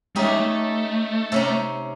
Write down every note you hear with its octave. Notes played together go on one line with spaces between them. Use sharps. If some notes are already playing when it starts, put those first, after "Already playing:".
G#3 C#4 D#4 G4 E5
A3
C3 C#4 A#5